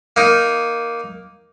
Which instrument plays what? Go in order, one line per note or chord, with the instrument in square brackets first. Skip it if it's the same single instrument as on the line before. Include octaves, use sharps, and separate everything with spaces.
[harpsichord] A#3 D#4